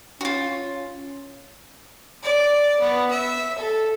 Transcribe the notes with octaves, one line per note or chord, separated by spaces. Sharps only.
C#4 F4 F#4
D5
B3
E5
A4